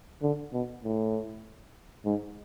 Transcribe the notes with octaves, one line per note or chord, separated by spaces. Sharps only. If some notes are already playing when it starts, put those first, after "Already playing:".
D3
B2
A2
G#2